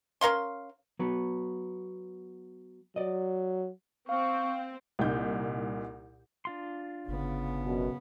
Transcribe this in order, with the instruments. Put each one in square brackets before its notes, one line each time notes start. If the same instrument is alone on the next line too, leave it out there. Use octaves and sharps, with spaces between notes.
[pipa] C#4 A#4 F5 C6
[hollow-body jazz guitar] F#3 B3
[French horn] F#3 [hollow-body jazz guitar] D5 D#5
[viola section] C4 [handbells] F5 F6 [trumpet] C#6
[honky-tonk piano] C2 A#2 D#4 G6
[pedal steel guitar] D4 F4 C6
[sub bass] G1 [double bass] C#3 B3
[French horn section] F#2 B2